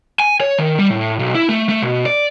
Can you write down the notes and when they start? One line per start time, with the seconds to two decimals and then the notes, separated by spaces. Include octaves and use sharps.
0.20 G#5
0.41 C#5
0.58 D#3
0.79 G3
0.90 A2
1.19 B1
1.35 E4
1.49 A3
1.69 A3
1.82 B2
2.06 D5